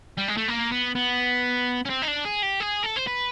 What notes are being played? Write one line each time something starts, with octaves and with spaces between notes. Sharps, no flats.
G3
G#3
A3
A#3
B3
B3
C#4
C4
D#4
D4
G#4
G4
G#4
A4
C5
B4